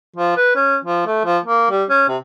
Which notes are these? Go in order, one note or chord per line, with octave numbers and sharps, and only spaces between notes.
F3
B4
C#4
F3
A3
F3
A#3
G3
C#4
C3